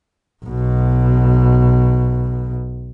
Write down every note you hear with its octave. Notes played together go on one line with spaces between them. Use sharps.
B1 B2